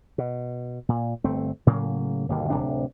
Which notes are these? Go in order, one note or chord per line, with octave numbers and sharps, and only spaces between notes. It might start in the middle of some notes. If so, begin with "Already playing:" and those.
B2
A#2
G1 A3 C4
A2 C#3 F#3 A#3
G1 D#2 B2 A#3
D1 C#2 C3 D4